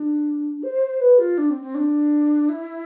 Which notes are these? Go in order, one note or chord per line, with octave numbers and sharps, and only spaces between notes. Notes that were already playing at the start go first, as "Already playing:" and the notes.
Already playing: D4
C5
B4
F4
D4
C4
C4
D4
E4